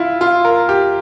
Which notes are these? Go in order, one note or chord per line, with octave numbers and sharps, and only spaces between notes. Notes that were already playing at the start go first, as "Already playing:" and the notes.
Already playing: E4 F4
F4
A#4
G4